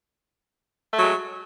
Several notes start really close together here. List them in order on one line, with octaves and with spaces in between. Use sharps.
A3 F#3 G#3